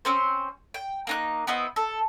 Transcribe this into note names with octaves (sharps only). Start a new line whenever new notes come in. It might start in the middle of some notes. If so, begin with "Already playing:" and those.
C4 C#4 C5
G5
A#3 D#4 F#6
B3 C4 E4 D#5
A4